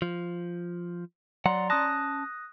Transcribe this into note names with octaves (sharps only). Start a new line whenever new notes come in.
F3
F#3 D5 F#5 A#5 C6
C#4 A5 D#6 F#6 A#6